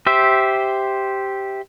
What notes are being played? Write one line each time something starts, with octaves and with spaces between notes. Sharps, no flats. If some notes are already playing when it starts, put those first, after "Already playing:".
G4 C5 E5